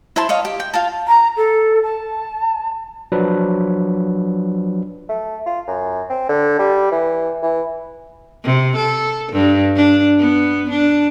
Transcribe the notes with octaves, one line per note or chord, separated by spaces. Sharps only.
E4 C5 A5 C6
C#5 D#5 F5
G4
G5
F4 F5 A5
A#5
A4
A5
F3 F#3 D4 B4
A3
F4
F#2
C4
D3
G3
E3
E3
C3
A4
G2
D4
B3
D4